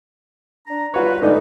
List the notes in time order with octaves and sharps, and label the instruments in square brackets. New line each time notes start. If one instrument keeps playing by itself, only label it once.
[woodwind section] D4 A#5
[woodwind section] G3 B4 [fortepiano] F4 F#4 C#5
[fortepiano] G#2 A3 [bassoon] D3 [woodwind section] D#4